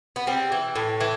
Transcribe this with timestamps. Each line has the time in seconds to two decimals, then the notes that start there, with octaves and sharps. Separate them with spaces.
0.16 B3
0.27 G3 C4
0.52 E3
0.76 A2
1.00 E3